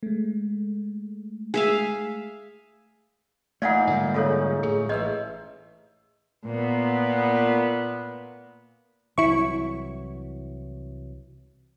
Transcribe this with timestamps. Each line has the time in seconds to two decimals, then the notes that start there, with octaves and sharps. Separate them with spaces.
0.03 G#3 A3
1.54 G#4 E5 F5
3.62 A#2 E3 A3 D#4 D5 F5 F#5
3.87 G#2 D3 G3
4.14 C#3 A3 D#4 F4 A4 C#5
4.63 A2 G#4
4.89 A1 B4 C5 D#5 E5
6.46 A#2 B3
9.18 C2 E3 F#3 E4 C#6